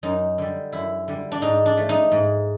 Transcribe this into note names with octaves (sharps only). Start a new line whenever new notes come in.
F#2 D#4
D3 G3
F#2 E4
D3 G3
D4
G#2 D#4
D4
F3 A3
D#4
G#2